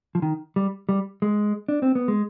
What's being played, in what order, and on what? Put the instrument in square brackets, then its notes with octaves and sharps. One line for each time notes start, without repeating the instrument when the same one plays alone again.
[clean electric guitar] F3
D#3
G3
G3
G#3
D4
C4
B3
G#3